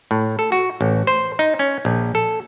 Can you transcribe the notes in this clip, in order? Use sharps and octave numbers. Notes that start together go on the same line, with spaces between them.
A2
A4
F#4
A1
C5
D#4
C#4
A#1
A4